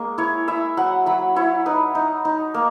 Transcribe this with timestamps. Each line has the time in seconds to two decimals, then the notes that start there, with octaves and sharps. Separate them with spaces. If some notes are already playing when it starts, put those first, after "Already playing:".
Already playing: G#3 A#3
0.18 E4 C#5
0.48 E4 E5
0.77 F#3 F#5
1.06 F#3 B5
1.36 E4 C#5
1.66 D#4 B4
1.95 D#4
2.25 D#4
2.54 A#3